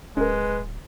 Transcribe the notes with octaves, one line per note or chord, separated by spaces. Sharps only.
D1 G#3 C#4 A#4 B4